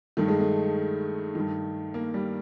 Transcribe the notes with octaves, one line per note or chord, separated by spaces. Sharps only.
G2 D#3 A3
G#3
A3
G2 D#3
A#3
G3